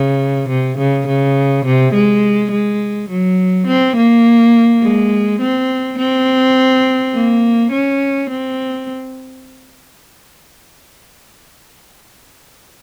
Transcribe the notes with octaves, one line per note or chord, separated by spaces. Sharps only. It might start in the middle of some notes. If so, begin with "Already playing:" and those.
Already playing: C#3
C3
C#3
C#3
C3
G#3
G#3
F#3
C4
A#3
G#3
C4
C4
A#3
C#4
C4